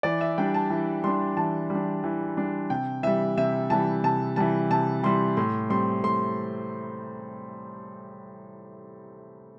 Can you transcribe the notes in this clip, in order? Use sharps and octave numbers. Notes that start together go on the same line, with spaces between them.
E3 D5
E5
G3 D4 G5
A5
E3
G3 D4 C6
E3 A5
G3
D4
E3
G3 D4
C3 G5
E3 G3 E5
C3 E5
E3 G3 A5
C3 A5
E3 G3 A5
C3 A5
E3 G3 C6
A2 C6
G3 C4 C6
A2 C6